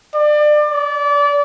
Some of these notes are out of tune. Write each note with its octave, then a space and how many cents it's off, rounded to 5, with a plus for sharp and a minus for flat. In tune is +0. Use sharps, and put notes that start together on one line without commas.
D5 +30
D5 -25